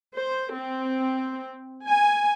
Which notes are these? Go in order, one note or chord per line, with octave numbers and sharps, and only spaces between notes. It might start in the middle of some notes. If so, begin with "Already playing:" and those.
C5
C4
G#5